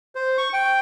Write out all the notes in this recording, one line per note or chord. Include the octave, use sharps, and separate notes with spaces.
C5
C#6
G5